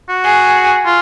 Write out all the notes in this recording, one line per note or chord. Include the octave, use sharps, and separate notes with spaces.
F#4
G#4
F4